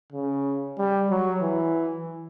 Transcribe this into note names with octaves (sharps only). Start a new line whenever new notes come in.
C#3
G3
F#3
E3